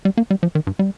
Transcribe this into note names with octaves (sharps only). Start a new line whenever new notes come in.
G3
A#3
G3
F3
D#3
G2
G3